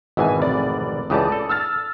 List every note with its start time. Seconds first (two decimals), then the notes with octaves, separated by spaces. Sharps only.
0.17 G#1 B2 E3 E5 G#5
0.39 F1 D5
1.10 C#2 E3 G4 D5 A5 D#6
1.32 A4
1.49 E6 F6 A6